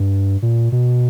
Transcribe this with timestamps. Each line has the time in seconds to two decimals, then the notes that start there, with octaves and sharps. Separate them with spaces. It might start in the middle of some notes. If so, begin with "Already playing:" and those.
Already playing: G2
0.42 A#2
0.72 B2